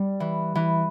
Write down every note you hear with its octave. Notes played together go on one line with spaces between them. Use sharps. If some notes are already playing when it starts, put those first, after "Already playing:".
Already playing: G3
E3
E3